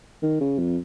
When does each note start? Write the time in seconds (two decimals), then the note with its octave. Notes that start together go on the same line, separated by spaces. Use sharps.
0.22 D#3
0.40 C#3
0.59 F2